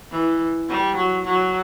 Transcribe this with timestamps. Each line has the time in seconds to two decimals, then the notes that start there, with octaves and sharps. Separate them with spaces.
0.11 E3
0.69 G3
0.97 F#3
1.25 F#3